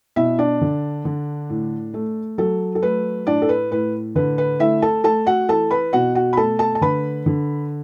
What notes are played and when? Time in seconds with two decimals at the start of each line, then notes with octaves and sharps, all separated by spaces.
0.16 B2 E4 E5
0.38 D4 D5
0.61 D3
1.05 D3
1.49 A2
1.94 A3
2.38 F#3 A4
2.75 A4
2.82 A3 B4
3.27 A2 D4 D5
3.42 A4
3.49 B4
3.71 A2 B4
4.15 D3 B4
4.38 B4
4.60 A3 E4 E5
4.82 A4 A5
5.04 A3 A4 A5
5.26 F#4 F#5
5.49 E3 A4 A5
5.71 B4 B5
5.93 B2 F#4 F#5
6.15 F#4 F#5
6.33 B5
6.37 A3 A4 A5
6.59 A4 A5
6.75 A5
6.81 D3 B4 B5
7.26 D3